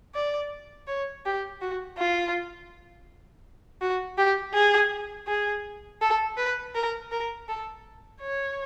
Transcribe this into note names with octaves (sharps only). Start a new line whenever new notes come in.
D5
C#5
G4
F#4
F4
F#4
G4
G#4
G#4
A4
B4
A#4
A#4
A4
C#5